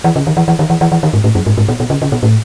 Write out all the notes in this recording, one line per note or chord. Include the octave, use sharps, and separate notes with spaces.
E3
C#3
D#3
E3
E3
D#3
E3
E3
E3
D#3
G#2
A2
F#2
G#2
G#2
B2
B2
C#3
C#3
B2
A2